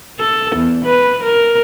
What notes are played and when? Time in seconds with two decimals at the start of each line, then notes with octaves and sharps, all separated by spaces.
0.20 A4
0.56 E2
0.86 B4
1.24 A#4